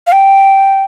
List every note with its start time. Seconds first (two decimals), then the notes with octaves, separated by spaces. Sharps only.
0.07 F5
0.12 G5